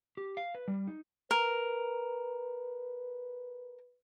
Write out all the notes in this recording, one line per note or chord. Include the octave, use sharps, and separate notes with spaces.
G4
F5
B4
G3
D#4
A#4 B4